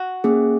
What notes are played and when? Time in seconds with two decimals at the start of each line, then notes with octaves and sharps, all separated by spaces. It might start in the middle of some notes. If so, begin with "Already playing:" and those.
Already playing: F#4
0.24 A#3 C#4 G#4